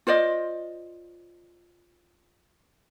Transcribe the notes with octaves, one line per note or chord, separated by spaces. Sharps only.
F4 C5 D5 D#5